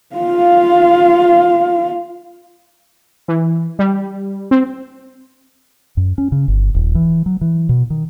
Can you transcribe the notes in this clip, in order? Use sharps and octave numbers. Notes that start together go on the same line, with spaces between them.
F4 F5
E3
G3
C4
F#2
C#4
C#3
G1
D#1
E3
F#3
E3
B2
D#3